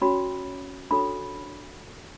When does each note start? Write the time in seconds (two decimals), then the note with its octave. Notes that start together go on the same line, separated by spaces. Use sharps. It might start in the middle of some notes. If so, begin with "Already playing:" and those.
0.02 C#4 F#4 C#5 B5
0.91 D4 F#4 A4 C#5 B5